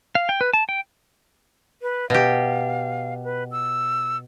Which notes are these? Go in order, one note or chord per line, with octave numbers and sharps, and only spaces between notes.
F5
G5
B4
A5
G5
B4
B2 G4 F5
B4
E6